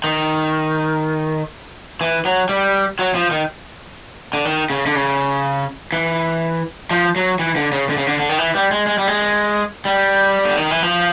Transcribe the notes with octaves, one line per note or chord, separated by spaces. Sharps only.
D#3
E3
F#3
G3
F#3
F3
D#3
D3
D#3
C#3
D3
C#3
E3
F3
F#3
E3
D3
C#3
D3
C#3
D3
D3
D#3
E3
G3
G#3
G#3
G3
G#3
G3
D3
D#3
E3
F3